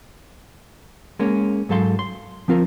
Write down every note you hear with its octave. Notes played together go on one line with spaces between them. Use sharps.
G#3 A#3 C#4
G#2 F#3 A4 F5 C6
C6
F3 C4 F4 A#4